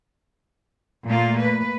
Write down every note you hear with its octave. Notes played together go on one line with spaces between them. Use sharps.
A#2 A3 A#3 F4
B4